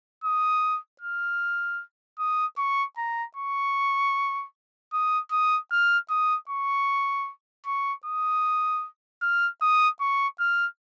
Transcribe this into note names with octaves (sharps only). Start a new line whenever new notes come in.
D#6
F6
D#6
C#6
A#5
C#6
D#6
D#6
F6
D#6
C#6
C#6
D#6
F6
D#6
C#6
F6